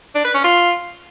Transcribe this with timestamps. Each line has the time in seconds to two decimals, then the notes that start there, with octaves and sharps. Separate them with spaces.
0.15 D4
0.24 B4
0.34 C#4
0.44 F4